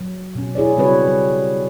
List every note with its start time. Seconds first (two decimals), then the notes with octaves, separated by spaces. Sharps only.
0.01 F#3
0.35 B2 C#4
0.55 E4 G#4 C#5 D5
0.77 C#3 G3 C4 F#4 B4 C#5
1.08 G3